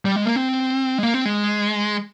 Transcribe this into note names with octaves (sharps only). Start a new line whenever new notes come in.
G3
G#3
A#3
C4
G#3
A#3
C4
G#3